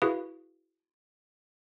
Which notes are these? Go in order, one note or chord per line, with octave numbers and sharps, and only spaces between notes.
E4 F#4 G#4 B4 F5